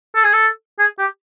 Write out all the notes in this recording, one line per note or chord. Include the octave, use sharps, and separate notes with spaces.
A4
G#4
A4
G#4
G4